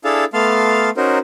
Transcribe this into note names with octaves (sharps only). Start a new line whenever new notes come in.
D4 E4 G#4 A4 F5 A5
A3 B3 F5 A5 C6 F6
C#4 D#4 F#4 A#4 C5